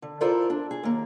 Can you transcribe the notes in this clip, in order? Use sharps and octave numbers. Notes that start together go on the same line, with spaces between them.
D3
E4 F4 A4 A#4 C5 D5
D4
G#4
D#2 A#3